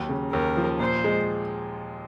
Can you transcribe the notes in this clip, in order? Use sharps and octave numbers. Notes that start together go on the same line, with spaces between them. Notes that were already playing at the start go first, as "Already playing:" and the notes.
Already playing: D#2 F#3
C#3
D#2 A#4
F3
A#2 C5
G#3